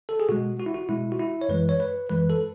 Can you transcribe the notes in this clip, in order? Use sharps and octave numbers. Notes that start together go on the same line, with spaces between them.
A4
G#4
B2 G#3 F#4
F#4
E4
F#4
B2 G#3 E4
F#4
E4
C#5
F#2 E3 G#3 B4
C#5
B4
F#2 E3 G#3 B4
A4